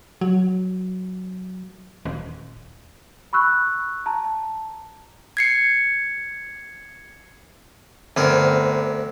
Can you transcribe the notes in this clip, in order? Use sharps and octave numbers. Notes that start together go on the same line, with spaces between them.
F#3
D#1
B5 C#6 E6 F#6
A5 A#5
G#6 C7 C#7
G1 D2 C4 A#4